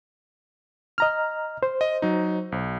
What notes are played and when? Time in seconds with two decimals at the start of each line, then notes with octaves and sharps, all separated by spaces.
0.98 D#5 A#5 F6
1.63 C5
1.81 D#5
2.02 F#3 D#4
2.52 B1